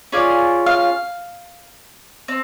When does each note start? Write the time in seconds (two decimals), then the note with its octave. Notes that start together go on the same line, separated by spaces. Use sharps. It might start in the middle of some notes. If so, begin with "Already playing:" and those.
0.12 C#4 F4 G#4 D5
0.67 F5
2.28 C4